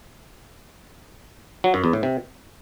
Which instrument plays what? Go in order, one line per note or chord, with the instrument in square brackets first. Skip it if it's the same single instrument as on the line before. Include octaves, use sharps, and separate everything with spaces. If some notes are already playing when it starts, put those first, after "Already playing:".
[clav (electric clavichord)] F#3
F#2
E2
A2
C3